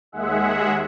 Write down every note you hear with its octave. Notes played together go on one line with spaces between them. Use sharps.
D#2 G#3 G#4 E5 F#5